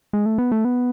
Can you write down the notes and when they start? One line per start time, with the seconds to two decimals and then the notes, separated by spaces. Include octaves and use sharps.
0.13 G#3
0.26 A3
0.38 B3
0.52 A3
0.65 B3